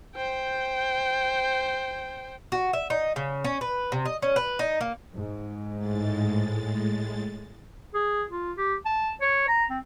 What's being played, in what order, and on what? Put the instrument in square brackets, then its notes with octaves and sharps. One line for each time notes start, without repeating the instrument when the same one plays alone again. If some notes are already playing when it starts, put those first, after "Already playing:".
[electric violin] C5 G5
[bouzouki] F#4
E5
D#4
C#3
C#4
B4
C3
D#5
C#4
B4
D#4
A#3
[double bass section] G#2
[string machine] A2 G#3 A6
[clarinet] G#4
F4
G4
A5
C#5
A#5
C4